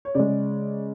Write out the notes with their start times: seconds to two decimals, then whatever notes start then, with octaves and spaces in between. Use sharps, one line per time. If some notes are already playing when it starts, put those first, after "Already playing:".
0.05 C#5
0.15 C#3 G#3 D5